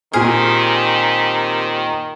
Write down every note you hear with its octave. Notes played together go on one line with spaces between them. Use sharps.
A#2 D#3 C4 G4 G#4 F6